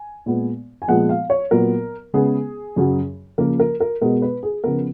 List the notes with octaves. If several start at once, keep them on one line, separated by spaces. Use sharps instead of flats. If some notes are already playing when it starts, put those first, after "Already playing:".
Already playing: G#5
A#2 G#3 B3
G#5
A#2 F3 G#3 B3 F#5
F5
C#5
A#2 F#3 B3 A#4
C#3 G#3 B3 G#4
F#2 C#3 F#3
C#3 F3 A#3 A#4
A#4
A#4
B2 G#3 B3 A#4
B4
G#4
C#3 F3 B3 A#4